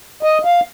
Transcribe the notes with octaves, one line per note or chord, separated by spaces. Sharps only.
D#5
F5